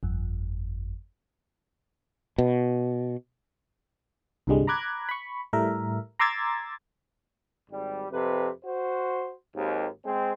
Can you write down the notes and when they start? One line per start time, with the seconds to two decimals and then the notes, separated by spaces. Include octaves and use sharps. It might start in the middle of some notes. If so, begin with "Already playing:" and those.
0.03 G1 F2
2.38 B2
4.47 C2 G2 D3 G3 G#3
4.67 A#5 B5 D6 F#6 G#6
5.09 B5 C#6
5.53 A2 G3 A3 A#4 E5
6.19 A#5 C6 D6 E6 G#6 A6
7.71 G#1 G3
8.11 F2 C3 B4
8.64 F#4 C5
9.54 G#1 D#2
10.04 G#3 C4